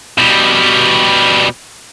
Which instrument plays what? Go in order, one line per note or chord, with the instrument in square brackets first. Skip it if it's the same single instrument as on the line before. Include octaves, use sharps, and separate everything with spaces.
[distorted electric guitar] B2 G3